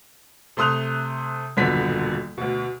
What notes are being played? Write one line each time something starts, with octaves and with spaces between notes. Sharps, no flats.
C3 A3 C6 D#6 F#6 F7
D#1 F#2 B2 D3 B3 B6
D2 B2